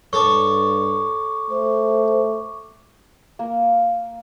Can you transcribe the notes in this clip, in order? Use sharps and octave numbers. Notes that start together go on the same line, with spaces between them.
G2 A4 C#5 C#6 D6
A3 C5
A#3